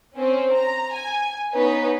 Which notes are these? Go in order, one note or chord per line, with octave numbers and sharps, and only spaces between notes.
C4 C#4
A#5
G#5
B3 C#4 D#4 B4